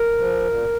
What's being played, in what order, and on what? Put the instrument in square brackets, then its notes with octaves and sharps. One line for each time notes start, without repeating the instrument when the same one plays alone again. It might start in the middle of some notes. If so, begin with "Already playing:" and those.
Already playing: [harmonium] A#4
F3
A#2